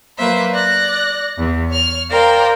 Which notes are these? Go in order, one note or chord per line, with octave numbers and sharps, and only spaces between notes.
F#3 A#3 B4 C5 E5
D5 F#6 A#6
E2
C#5 F6
A#4 C5 D5 F5 G5